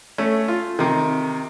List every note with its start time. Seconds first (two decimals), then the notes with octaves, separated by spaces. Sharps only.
0.18 A3 C#4
0.48 F4
0.79 C3 D#3